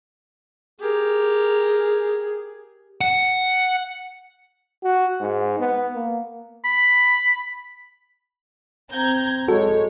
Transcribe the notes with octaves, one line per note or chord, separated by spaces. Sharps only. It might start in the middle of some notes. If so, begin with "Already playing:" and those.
G4 G#4 A#4
F#5
F#4
G#2
B3
A#3
B5
C4 A#5 G6 G#6
G#3 F#4 A4 C#5